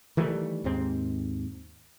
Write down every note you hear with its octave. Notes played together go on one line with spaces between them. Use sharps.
D#3 E3 G3 A3
D#2 G#2 C4